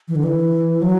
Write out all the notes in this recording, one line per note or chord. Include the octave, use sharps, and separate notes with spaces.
E3
D3
E3
F#3